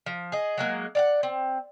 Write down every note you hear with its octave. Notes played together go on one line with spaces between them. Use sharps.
F3
G#4 D#5
F#3 G#3 A#3
D5 F5 F#5
C4